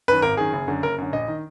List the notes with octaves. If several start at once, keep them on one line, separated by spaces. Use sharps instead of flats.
F#2 D#3 B4
G#1 A#4
F#2 D#3 G#4
F#1
F#2 D3
F#1 A#4
F#2 D3
A#1 D#5
D#3